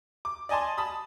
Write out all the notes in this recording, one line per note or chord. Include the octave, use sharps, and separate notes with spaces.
D6
D5 D#5 G#5 A5 C6
A5 B5 D#6